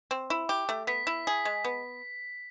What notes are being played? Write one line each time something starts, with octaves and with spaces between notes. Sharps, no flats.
C4
E4
G4
A3
B3 B6
E4
G#4
G#3
B3